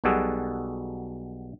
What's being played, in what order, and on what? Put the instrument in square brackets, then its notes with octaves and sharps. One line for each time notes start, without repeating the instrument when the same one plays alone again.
[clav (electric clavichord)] B1 B2 G3 F#4 G#4 A4